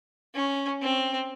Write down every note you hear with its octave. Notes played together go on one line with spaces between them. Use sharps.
C#4
C4